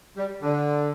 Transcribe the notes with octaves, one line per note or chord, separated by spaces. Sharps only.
G3
D3